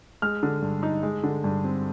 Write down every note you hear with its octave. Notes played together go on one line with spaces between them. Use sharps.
G#3 F6
D3
G2
D#4
G#3
D3
G2
C4